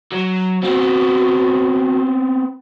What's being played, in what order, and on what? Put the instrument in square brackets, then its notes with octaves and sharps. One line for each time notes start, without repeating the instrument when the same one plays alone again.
[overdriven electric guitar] F#3
[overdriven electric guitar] B3 C4 [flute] F#4